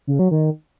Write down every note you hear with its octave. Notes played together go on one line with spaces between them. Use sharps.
C#3
F#3
D#3